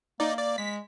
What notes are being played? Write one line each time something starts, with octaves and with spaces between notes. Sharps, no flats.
A#3 D#4 D5
D5
G#3 B6